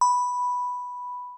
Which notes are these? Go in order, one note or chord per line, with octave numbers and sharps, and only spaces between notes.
B5